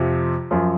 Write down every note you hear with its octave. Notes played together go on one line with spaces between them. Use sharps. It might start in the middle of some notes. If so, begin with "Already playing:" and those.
Already playing: F2 C3 F3
F#2 F3